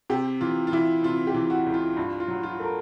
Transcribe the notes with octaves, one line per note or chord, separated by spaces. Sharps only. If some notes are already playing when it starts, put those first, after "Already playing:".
C3 G4
E3 F4
F4
E3 E4
C3 F4
G4
E3
F#4
C#2
F4
G2 F4
F4
F#3
F4
A3 A#4